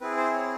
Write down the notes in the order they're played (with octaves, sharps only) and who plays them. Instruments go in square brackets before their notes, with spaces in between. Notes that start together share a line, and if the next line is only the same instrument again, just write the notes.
[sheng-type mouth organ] C4 E4 G#4 B4
C5
C#5